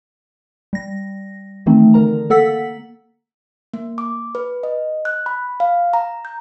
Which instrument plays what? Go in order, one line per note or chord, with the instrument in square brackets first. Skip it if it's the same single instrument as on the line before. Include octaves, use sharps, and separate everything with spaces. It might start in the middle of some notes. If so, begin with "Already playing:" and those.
[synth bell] G3 A#6
D#3 E3 A3 C4 D#4
D3 A#4 A#5
A#3 A4 F#5 E6 B6
[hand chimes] A#3
D6
B4
D#5
F#6
B5
F5
A#5
G6